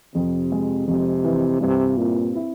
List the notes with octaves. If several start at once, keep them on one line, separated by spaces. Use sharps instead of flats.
F2 C3
G#3
F2 C3
E3
G2 C3
A#2 C4
E4